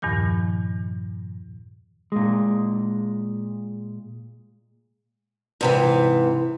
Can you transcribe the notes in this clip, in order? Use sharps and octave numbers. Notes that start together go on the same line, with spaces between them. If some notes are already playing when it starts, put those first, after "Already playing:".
E2 G2 A#2 D#3 F3
A#2 G#3
G#2 C3 E3